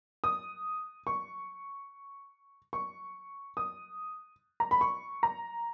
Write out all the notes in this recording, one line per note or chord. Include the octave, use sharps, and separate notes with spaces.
D#6
C#6
C#6
D#6
A#5
B5
C#6
A#5